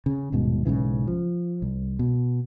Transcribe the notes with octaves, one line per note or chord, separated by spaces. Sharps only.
C#3
D#1 G#2 B2
B1 G#2 C#3 E3
F3
C2
B2